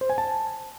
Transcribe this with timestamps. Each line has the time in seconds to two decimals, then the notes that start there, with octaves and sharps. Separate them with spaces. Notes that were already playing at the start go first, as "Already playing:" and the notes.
0.01 C5
0.10 G#5
0.18 A5